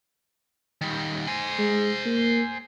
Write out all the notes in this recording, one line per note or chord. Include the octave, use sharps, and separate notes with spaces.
D#3 G3
C5 G#5
G#3
A#3